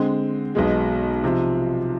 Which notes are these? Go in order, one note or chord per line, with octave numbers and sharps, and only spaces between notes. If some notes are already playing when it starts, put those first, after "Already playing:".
Already playing: D3 G#3 C4
B1 B2 G#3
C3 F3